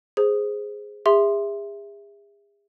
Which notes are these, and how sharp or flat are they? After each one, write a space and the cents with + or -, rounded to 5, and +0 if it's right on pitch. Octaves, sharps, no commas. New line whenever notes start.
G#4 +0 C5 +0
G#4 -40 E5 +0 C6 +0